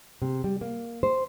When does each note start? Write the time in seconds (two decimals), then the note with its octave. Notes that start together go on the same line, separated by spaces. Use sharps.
0.22 C3
0.44 G3
0.61 A#3
1.03 C5